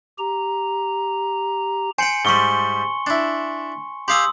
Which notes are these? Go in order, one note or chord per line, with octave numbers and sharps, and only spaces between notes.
G4 A#5
C5 G5 G#5 C#7 F#7
G#2 G3 C6 C#6 G7
D4 E4
G4 F5 G#5 C6 D#6 E6